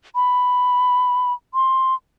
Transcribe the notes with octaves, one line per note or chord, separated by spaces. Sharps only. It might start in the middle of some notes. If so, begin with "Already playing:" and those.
B5
C6